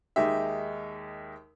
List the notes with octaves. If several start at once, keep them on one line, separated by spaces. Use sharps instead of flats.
D#2 G#3 D#4 G4 E5